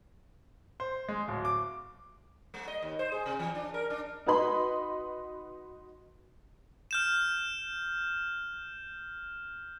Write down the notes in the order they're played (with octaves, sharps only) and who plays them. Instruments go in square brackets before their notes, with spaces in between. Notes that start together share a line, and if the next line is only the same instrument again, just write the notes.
[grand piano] C5
G#3
D1
D6
[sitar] G#3
D#5
D#2
C5
G#4
C3
E3
D4
A#4
D4
[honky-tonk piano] D#4 F#4 B4 D#5 B5 C6
[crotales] F6 G6 E7